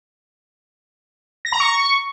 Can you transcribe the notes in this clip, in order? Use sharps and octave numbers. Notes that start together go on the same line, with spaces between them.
A#6
A#5
C#6